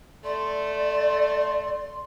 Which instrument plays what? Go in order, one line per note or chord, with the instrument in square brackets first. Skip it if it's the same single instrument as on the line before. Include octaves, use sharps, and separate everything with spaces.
[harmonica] A3 [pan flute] D5 [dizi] C6